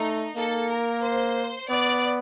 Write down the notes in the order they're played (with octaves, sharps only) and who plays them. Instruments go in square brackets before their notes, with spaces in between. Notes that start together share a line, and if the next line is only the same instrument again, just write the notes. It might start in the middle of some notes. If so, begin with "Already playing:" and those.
Already playing: [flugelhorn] A3 [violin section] D#4
[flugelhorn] A#3 [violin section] A4
[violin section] A#4
C5
[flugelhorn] B3 [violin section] D5